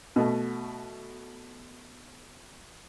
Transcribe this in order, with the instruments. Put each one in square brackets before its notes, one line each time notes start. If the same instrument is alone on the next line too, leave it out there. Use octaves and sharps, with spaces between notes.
[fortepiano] B2 A3